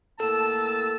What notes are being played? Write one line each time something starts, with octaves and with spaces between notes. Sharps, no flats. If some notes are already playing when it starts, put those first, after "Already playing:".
A2 A#3 A4 A5 E6